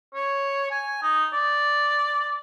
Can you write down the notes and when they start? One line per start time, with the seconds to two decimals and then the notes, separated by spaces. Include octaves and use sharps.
0.14 C#5
0.71 G#5
1.02 D#4
1.33 D5